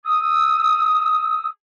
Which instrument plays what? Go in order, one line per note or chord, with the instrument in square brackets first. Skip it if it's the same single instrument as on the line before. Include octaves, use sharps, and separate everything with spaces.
[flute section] D#6 E6